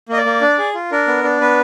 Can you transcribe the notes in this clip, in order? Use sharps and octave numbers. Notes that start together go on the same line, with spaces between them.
A#3 D#5
D5
A#3
D4
G#4
F4
D4 A#4
B3
D4
B3 B4